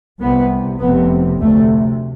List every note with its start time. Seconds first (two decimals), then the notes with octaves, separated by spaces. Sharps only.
0.20 C2 C3 B3
0.80 F1 F2 C3 B3
1.40 D2 C3 A3